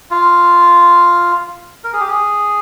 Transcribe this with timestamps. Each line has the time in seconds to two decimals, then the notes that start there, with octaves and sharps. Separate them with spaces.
0.11 F4
1.84 A#4
1.93 G#4
2.00 G4
2.08 G#4